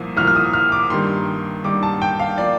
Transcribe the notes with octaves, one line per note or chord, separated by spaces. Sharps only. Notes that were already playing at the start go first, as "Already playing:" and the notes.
Already playing: C2 A#2 F3 A#3
C2 A#2 F3 A#3 F6
F6
D#6
F6
D6
G2 D#3 G3 A#3 C6
G2 D#3 G3 A#3 D6
A5
G5
F5
F3 A#3 D5